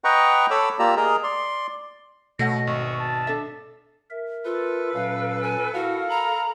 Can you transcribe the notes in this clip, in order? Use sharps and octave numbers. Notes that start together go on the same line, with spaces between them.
B4 D#5 F#5 G5 A#5 C#6
A4 C#5 B5 D6 E6
A#3 F4 G4 D5 A#5 E6
G#4 A#4 D#5 A#5
D5 C6
B2 A3 C#5 F#5 A#6
G#1 C#6
A5
D4 A4 E5
A#4 E5
F4 A4 B4
A#2 F#3 C#4 F5
G#5
E4 F#4 A4 A#4 F5 F#5
A#5 B5